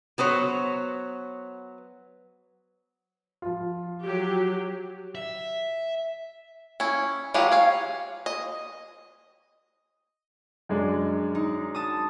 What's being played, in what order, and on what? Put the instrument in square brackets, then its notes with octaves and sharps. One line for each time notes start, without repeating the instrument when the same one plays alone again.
[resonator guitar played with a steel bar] F#3 B3 C5 C#5
[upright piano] F3 F4
[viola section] F#3 G4
[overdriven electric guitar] E5
[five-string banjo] C#4 E4
E3 F#3 G#3 F4 G4
C#5 F5
D#5
[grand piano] F#2 G#3 D4
[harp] D#4
A5 D#6